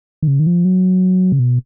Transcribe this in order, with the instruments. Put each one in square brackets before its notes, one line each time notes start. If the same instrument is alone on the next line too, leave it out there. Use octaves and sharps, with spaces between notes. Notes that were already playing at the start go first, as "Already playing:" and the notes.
[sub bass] D#3
C#3
D#3
F3
F#3
C#3
B2